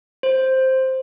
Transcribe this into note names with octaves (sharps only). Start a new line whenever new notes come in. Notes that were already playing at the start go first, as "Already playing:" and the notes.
C5